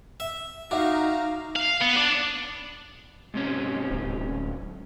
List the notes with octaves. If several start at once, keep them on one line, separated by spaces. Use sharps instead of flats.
E5
D#4 F#4 E5 F5 A#5 D6
F5
B3
D4
G#2 C3 C#4
D1